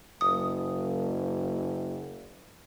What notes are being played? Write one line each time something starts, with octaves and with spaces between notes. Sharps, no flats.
F#1 D#6